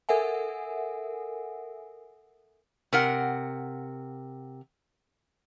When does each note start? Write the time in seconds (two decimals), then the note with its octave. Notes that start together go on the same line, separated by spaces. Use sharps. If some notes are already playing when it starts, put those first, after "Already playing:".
0.09 A4 A#4 E5 F#5 G#5
2.93 C3 A#4 F#5